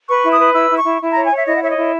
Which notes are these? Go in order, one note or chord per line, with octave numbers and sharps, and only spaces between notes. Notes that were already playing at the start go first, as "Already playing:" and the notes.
B4 C#6
E4
D#6
B4
E4 E6
E4
C#6
E4
E4
C#5 A#5
G#5
C#5 E5
E4 D#5
F#5
C#5 E5
D#5
E4